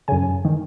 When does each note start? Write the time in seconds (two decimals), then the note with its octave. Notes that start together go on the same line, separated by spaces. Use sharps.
0.08 F#2 C#3 G#5
0.45 D#3